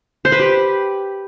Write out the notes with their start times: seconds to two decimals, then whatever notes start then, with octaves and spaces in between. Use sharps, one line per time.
0.25 C5
0.32 B4
0.40 G4